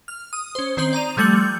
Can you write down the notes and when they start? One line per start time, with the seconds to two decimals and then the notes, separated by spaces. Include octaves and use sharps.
0.08 F6
0.33 D#6
0.55 C#4 C5
0.77 D#3 C4 C5 D#6 F#7
0.93 D5 A#5 D#7 F7
1.17 F3 G3 A3 G6 C#7 F#7